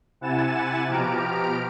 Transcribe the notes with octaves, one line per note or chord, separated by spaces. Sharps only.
C3 E4 F#5 G#5 A6 E7
B2 F3 G4 A#5 F6 D7